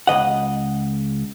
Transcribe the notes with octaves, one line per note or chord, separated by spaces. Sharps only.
C#2 B2 D#5 F#5